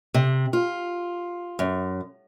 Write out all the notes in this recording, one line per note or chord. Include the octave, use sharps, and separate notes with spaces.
C3
F4
F#2